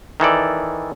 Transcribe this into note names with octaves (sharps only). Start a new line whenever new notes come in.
D#3 E3 A4 D5